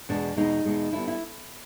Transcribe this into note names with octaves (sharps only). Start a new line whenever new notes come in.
E2 B2 G#3 D4
E2 B2 G#3 D#4
E2 B2 G#3
D3 G3 B3 E4
E4